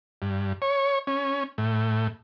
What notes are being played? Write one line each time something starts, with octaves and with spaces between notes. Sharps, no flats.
G2
C#5
C#4
A2